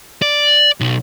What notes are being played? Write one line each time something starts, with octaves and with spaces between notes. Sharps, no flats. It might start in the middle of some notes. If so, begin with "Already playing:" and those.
D5
B1